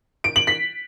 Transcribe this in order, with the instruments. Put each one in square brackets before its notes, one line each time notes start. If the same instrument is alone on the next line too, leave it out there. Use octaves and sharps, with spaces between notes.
[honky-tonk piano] D7
F#7
B6